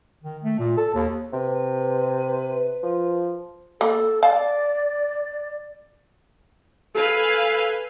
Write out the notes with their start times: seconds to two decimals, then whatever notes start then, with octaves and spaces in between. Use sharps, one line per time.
0.23 D#3
0.44 A3
0.59 A#2
0.77 A4
0.94 D#2
1.33 C3 B4
2.83 F3
3.81 A#3 A4
4.23 D5 F5 A5
6.95 A4 B4 F5 G#5